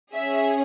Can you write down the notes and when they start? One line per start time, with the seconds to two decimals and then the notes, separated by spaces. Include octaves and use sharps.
0.13 C#4 G#4 E5